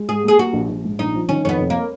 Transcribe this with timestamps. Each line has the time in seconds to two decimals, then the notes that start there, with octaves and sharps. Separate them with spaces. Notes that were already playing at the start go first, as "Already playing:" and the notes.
Already playing: G#3
0.08 G#2 G#4
0.23 A#3 G#4
0.39 A#3 F#4
0.53 A#1
0.69 A#1
0.85 G#2
0.99 A#1 D#4
1.15 F3
1.29 D#3 C#4
1.44 F2 C#4
1.49 B3
1.59 F1
1.70 A#3